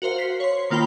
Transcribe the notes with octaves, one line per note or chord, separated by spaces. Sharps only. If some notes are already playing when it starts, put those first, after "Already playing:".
F#4 A#4 C5 F5
B6 C7
C#5 C6
D#3 A#3 F4 G5 B5 G7